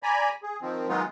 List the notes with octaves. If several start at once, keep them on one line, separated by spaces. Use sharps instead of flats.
D5 G#5 A#5 B5
G#4
D#3 F3 C4
D#3 F#3 G#3 B3 D#4 F4